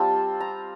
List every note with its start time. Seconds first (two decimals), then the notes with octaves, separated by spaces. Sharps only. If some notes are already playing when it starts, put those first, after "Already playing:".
Already playing: G3 C4 F4 A5
0.40 A#5